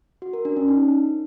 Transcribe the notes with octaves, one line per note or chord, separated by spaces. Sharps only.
F#4
A#4
D4
C#4
D#4